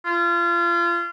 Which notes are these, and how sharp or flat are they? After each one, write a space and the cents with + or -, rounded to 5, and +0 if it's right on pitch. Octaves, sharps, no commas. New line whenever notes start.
F4 -30